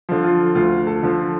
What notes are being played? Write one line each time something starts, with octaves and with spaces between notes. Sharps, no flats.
D3 F3
F4
D2 F4
A4
D3 F3